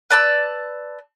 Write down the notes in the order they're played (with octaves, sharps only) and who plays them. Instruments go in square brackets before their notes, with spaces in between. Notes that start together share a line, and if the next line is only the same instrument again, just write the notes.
[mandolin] B4 D5 A5 E6